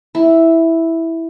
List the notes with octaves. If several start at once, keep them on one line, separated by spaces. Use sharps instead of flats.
E4